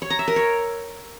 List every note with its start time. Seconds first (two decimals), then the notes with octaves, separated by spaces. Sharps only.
0.02 C#5
0.10 A#5
0.19 E5
0.28 A#4
0.36 C#5